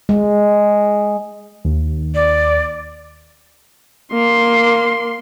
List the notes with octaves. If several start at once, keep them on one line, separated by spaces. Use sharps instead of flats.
G#3
D#2
D5
A#3 C6